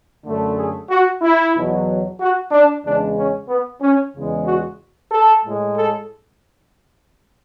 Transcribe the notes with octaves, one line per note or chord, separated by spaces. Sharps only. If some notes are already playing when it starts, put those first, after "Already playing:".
F#2 D3 A3
G#4
F#4
E4
E2 B2 F#3
F#4
D4
E2 C#3 G#3 D4
C#4
B3
C#4
E2 C#3 G#3
F#4
A4
A2 G#3
A4